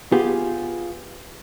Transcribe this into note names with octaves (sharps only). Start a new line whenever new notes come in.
B3 F4 G4 G#4